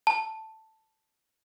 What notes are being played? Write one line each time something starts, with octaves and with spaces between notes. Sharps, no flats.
A5